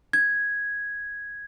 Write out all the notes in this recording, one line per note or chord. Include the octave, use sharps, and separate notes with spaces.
G#6